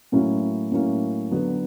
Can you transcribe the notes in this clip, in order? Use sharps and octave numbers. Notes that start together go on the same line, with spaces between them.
A2 F#3 A#3 C#4 E4
A2 F#3 A#3 C#4 E4
D3 F#3 B3